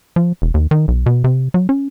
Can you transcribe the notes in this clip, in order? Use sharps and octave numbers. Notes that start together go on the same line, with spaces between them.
F3
E1
D#2
D#3
B1
B2
C3
F#3
C#4